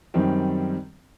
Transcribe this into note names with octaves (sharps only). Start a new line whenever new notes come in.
F#2 D#3 G3 C4